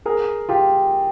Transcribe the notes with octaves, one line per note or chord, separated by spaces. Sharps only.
G#4 A#4
F4 G4